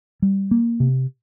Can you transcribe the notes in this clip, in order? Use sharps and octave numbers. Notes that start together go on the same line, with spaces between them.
G3
A#3
C3